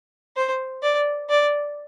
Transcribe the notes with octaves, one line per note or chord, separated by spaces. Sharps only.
C5
D5
D5